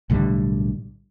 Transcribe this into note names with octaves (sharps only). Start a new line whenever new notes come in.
B1 A2 D3 G3